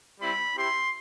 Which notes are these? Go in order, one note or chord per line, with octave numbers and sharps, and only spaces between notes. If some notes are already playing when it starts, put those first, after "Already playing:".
G3 C4 E4 B5
C4 E4 G4 C6